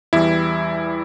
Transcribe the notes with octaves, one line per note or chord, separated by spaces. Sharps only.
E2 E3 G3 E4